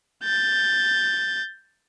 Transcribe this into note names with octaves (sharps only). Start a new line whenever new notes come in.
G6 A6